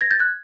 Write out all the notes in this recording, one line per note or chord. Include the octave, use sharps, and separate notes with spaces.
G#6 A#6
G6 A6
F#6 G#6